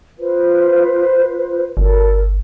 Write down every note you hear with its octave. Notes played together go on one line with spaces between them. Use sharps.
F4 B4 C5
G1 A4 A#4